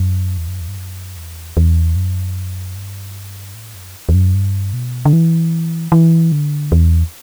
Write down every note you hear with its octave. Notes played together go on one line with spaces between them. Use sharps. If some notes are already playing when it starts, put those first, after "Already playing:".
Already playing: F#2
E2
F#2
E2
G2
F#2
E2
E2
F#2
G2
A2
F#2
E2
F#2
G2
B2
D3
E3
E3
D3
E2